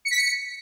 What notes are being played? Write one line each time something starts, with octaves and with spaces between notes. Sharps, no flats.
C#7
B6
C#7